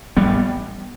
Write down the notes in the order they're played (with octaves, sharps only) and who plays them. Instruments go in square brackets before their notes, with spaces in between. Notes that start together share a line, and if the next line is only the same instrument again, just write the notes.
[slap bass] A1 G3 B3